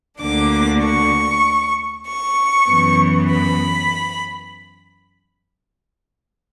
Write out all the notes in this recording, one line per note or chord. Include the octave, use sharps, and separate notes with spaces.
D2 D3 A#3 D4 D6
C#6
C#6
F#2 E3 B3
B5